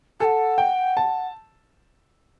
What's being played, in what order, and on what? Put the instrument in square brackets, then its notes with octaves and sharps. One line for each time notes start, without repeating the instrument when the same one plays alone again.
[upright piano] A4 [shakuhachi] F#5 G#5
[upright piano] G5
A5